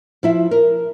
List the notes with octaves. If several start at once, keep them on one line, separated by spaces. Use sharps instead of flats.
F3 E4 E5
A#4